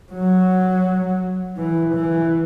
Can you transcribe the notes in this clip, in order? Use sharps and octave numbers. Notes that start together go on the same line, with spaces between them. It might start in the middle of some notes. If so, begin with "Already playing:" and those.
F#3
E3
E3